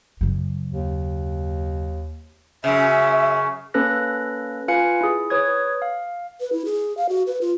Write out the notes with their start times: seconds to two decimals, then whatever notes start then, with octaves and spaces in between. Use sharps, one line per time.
0.21 F#2 C#3
0.70 D#2
2.64 F#2 C#3 E5
3.74 A#3 C#4 A4 B4 F#6 A#6
4.68 F4 B4 F5 G#5 C#7
5.01 E4 G#4
5.30 B4 C#5 D#6 G#6
5.82 F5
6.40 B4
6.52 E4
6.65 G#4
6.97 F5
7.09 F#4
7.27 B4
7.41 F4